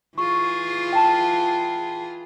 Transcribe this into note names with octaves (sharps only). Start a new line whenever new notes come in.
E3 F4 G#4 C#6
G5 A5